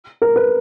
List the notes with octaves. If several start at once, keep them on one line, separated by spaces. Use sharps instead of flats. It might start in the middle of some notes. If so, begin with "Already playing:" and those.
A#4
B4